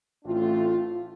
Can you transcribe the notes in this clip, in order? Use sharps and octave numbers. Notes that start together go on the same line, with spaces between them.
A1 A3 C4 D4 F4